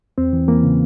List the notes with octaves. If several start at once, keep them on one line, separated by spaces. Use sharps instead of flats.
E2 C4
E3
E3 A#3
C#3